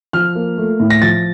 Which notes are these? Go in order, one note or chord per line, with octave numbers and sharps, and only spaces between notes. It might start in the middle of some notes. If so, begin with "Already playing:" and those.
F3 F6
A#3
A3
A2
A#6
F3 A6